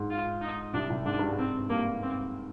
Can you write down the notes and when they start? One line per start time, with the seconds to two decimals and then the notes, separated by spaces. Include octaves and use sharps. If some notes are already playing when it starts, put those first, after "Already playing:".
Already playing: G#2
0.10 F4
0.41 D#4
0.73 C2 C3 D4
0.89 C2 C3
1.05 G#2 D4
1.19 G2
1.32 G#2
1.38 C4
1.69 G2 A#3
2.02 C4